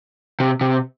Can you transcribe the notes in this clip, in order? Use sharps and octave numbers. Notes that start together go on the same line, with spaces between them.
C3
C3